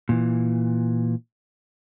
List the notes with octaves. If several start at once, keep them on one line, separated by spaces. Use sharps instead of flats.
A#2 E3